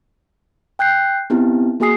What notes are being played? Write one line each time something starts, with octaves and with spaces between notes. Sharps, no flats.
G5 F#6 G6 C7
B3 C4 D#4 E4 G4
A#3 F#4 G#4 G#5 D#6 C7